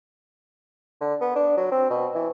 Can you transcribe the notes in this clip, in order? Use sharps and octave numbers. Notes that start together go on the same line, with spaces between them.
D3
B3
D4
F#3
C4
B2
E3